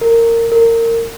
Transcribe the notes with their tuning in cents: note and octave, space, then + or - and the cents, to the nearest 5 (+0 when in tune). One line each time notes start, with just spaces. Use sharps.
A#4 -20
A#4 -25